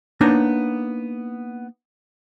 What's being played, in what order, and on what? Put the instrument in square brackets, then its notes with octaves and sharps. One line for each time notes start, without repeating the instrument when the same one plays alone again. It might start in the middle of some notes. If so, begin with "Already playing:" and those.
[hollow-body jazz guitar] A#3 B3 D4 D#4 C#5 A#5